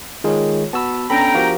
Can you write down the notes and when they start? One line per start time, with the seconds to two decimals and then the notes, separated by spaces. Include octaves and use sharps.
0.24 D#3 G#3 F4 G#4 C#5
0.73 B3 F#4 A5 B5 E6
1.10 B3 C#4 D4 A4 G5 A#5 B5
1.35 F3 F#4 G4 A#4 F5